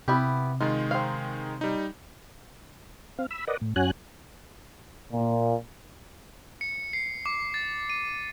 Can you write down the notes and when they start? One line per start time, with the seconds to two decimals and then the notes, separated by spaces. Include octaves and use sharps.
0.08 C3 B3 E4 G4
0.61 D#3 G#3 D#4 F4
0.91 C4 F5
1.61 G3 D#4
3.18 C4 F5
3.31 B5 E6
3.47 A#4 B4 D5 D#5 F#5
3.61 A2
3.76 F#2 C#4 F#4 G#5 F#6
5.12 A#2
6.61 C#7
6.93 C7
7.26 D6
7.54 A6
7.90 D#7